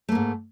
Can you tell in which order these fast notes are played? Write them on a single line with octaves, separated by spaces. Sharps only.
A3 A#3 G#2